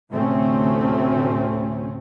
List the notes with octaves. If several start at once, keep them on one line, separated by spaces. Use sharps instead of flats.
D2 A2 C3 A3 C4 C#4